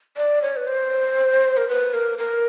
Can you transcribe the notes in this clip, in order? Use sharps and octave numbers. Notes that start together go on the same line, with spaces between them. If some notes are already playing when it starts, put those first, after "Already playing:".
D5
C#5
B4
C5
A#4
B4
A#4
A#4